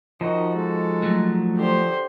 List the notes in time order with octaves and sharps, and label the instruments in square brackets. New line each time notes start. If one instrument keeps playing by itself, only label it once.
[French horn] D#3 [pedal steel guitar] F3 D#4 F#4 [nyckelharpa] D#5
[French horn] G#3 [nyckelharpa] A4
[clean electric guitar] F#3 A3
[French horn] D3 [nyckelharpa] G4 C5